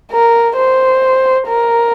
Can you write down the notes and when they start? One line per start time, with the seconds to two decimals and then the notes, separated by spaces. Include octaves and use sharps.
0.12 A#4
0.57 C5
1.48 A#4